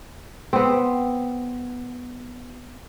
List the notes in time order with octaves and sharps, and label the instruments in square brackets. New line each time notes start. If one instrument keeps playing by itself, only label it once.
[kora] B3 C4